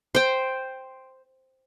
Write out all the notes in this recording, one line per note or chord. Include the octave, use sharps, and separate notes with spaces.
C5 G5